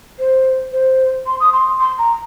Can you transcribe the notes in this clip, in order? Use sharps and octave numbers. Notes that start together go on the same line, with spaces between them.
C5
C5
C6
D#6
C6
C6
A#5